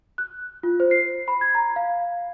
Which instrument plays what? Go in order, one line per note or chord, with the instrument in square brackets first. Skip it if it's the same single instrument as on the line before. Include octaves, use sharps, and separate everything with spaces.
[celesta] F#6
F4
C5
C7
B5
G#6
A#5
F5